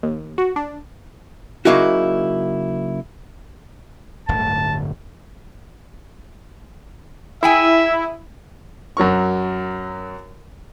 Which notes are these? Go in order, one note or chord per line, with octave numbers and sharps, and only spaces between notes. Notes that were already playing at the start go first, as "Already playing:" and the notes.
D#2
F#4
D4
C#3 F#3 A#3 D#4 E4 F#4
D1 G1 D2 A5
E4 G#4 E5 G5 G#5
F#2 F#3 A#4 C#6